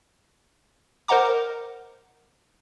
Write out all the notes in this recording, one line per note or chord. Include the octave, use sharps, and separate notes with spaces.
A#4 C5 D#5 F#5 A#5 D6